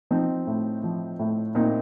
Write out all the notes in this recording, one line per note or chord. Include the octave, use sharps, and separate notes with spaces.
F3 C4 D#4
A2
F3
A2
A#2 C4 D#4